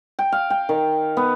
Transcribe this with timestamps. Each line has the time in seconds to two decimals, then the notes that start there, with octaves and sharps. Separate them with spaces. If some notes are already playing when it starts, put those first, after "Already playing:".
0.19 G5
0.32 F5
0.50 G5
0.69 D#3
1.17 B3